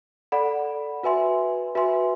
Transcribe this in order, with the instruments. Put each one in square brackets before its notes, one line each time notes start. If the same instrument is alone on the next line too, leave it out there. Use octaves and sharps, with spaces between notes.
[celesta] A4 D5 F#5 B5
F#4 B4 E5 G#5 C6
F#4 B4 E5 G#5 C6